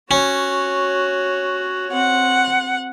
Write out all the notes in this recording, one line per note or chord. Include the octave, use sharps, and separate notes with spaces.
C#4 F#4 C#5
C4 F#5